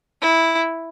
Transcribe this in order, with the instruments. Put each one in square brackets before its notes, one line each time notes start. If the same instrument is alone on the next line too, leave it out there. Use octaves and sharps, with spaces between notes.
[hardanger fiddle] E4